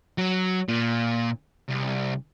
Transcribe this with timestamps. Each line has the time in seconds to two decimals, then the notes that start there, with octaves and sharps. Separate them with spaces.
0.18 F#3
0.68 A#2
1.68 C2